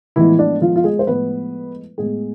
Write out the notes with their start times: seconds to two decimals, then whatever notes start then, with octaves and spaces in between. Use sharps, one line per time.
0.16 A2 E3 F3 G#3 B3 E4
0.39 D4
0.61 F3 F4
0.76 F4
0.84 G#3 G#4
0.99 C5
1.07 A2 F3 G#3 B3 B4
1.98 A2 G#3 B3 G#4